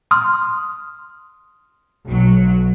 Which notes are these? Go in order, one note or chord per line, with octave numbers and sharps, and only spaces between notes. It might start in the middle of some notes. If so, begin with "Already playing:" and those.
C6 D#6 F6
B1 F#3